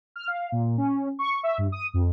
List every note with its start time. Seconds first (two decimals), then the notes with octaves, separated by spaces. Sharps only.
0.16 F6
0.28 F5
0.52 A#2
0.77 C#4
1.19 C#6
1.43 E5
1.58 G2
1.72 D#6
1.94 F2